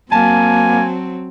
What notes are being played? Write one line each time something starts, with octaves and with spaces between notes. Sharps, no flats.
F#3 A#3 C4 G#5 A5